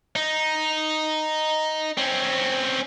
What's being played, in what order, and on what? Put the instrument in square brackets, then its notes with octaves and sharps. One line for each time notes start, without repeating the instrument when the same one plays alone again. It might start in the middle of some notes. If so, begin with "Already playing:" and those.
[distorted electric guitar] D#4
C4 C#4